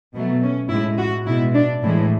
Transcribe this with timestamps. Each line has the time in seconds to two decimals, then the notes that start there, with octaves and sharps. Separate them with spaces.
0.14 B2 F#3 A3 B3
0.42 C#4
0.69 A2 G#3 E4
0.98 F#4
1.26 B2 G#3 E4
1.55 D4
1.83 A2 E3 G#3 E4